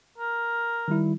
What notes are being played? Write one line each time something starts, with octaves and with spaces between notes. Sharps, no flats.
A#4
D#3 G3 E4